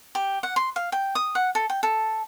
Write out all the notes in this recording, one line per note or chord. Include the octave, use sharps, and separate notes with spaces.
G4
F#5
C6
F5
G5
D#6
F#5
A4
G5
A4